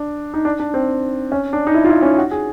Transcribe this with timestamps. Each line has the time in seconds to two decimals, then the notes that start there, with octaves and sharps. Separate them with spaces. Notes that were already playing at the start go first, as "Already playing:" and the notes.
Already playing: D4
0.34 D#4
0.45 D4
0.60 D4
0.74 C4
1.32 C#4
1.53 D4
1.67 D#4
1.74 E4
1.84 F4
1.89 E4
2.03 C#4
2.18 F#4
2.31 G#4